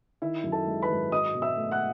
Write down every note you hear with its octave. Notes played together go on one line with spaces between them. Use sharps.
D#3 E4 E5
F#2
A4 A5
G#3
B4 B5
G#1
F#3 D#5 D#6
B2
E5 E6
A3
F#5 F#6